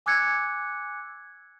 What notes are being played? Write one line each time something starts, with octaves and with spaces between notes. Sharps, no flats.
G#5 D6 E6 F#6 G#6 C#7